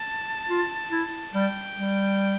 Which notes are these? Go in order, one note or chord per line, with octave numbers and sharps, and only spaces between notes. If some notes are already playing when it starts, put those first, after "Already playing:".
Already playing: A5
F4
E4
G3 G5
G3